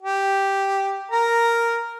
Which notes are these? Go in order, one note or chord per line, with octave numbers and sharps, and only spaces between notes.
G4
A#4 A#5